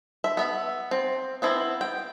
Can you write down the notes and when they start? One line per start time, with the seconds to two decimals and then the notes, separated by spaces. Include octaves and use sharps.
0.24 E5
0.37 B3 E5
0.91 C4
1.42 B3 C4 E4
1.81 G5